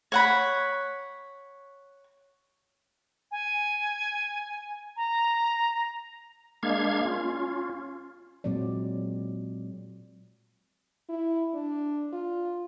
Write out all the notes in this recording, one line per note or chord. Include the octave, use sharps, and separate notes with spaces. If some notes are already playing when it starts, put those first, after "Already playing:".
C#5 F#5 B5
G#5
A#5
G#3 A#3 D4 F5 G#6
C#4 F4
A#2 F#3 G#3 C4 D5
E4
D4
F4